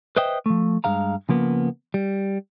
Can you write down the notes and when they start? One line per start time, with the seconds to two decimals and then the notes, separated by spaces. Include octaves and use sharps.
0.16 B4 C5 D#5 E5 G5
0.46 F3 A3
0.84 G2 G#3 F5 A#5
1.29 C#3 F3 A#3 B3
1.94 G3